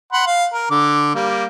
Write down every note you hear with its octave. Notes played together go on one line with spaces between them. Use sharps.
F#5 B5 C6
F5
A#4
D3 D6
G3 A#3